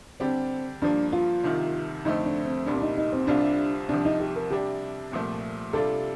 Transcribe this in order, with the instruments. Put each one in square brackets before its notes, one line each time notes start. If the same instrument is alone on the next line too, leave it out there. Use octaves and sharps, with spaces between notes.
[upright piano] D3 G3 D4 G4 [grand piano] C4
[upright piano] G2 F3 A#3 [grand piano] D4
[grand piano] F4
[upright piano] C2 C3 D#3
[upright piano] F2 D3 A3 C4 [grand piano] D#4
[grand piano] D4
C4
[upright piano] C2 A#2 G3 [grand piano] D4
[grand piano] D4
D#4
D#4
C4
[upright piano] C2 C3 G3 C4 F4 [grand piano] D4
[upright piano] C2 C3 F3 [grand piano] D4
[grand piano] D#4
G4
A#4
[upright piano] C3 G3 D4 [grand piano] G4
[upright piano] C2 A#2 F3 A3
[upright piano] C3 G3 D4 F4 [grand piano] A4